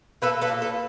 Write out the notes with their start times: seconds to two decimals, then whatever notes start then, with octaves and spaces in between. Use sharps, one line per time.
0.22 A#3 A4 B4
0.41 A4 B4
0.49 A#2
0.62 A4 B4